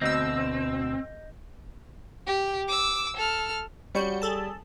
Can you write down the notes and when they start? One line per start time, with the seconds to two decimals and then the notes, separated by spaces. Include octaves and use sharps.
0.01 D2 B2 C4 D#5 E6 G6 A#6
2.27 G4
2.68 D6 E6
3.16 A4 F6
3.95 G3 F#4 C#5 G6 C#7
4.22 G#4 A4 A5